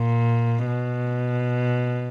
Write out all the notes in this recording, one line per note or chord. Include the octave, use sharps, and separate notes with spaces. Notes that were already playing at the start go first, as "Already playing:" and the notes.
Already playing: A#2
B2